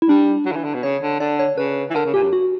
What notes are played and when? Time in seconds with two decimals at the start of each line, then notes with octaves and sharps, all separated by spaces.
0.02 E4
0.09 G3 D4
0.46 F#3
0.52 D3
0.56 E3
0.64 D3
0.74 B2
0.83 C#3 C#5
1.03 D3
1.20 D3 D5
1.39 C#5
1.58 C#3 B4
1.91 E3
1.95 D3 A#4
2.05 C#3
2.14 A#2 G4
2.23 F#2
2.33 F#4